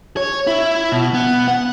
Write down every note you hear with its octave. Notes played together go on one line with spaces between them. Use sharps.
C#5
E4
B2
B3
F#5